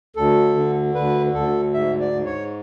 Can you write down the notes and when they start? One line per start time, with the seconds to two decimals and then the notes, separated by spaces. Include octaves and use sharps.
0.16 D2 A4
0.55 D3
0.95 D2 B4
1.34 D2 A4
1.74 G#2 E5
1.99 D5
2.13 G#2
2.25 C#5